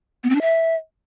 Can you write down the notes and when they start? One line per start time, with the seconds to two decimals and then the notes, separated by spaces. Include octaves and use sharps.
0.24 B3
0.30 C4
0.35 D4
0.41 E5